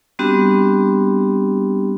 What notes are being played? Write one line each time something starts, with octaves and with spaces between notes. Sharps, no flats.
G3 B3 C4 D4 F#4 G4